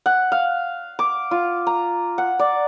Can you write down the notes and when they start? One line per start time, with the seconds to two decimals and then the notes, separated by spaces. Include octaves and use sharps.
0.06 F#5
0.32 F5
0.99 D6
1.31 F4
1.67 A#5
2.18 F#5
2.39 D5